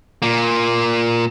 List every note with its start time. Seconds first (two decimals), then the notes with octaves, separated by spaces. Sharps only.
0.22 A#2 A#3